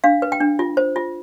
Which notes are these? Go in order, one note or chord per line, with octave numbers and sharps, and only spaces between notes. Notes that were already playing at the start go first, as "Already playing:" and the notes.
D4 F5
B4
G5
D4
F4
C5
F4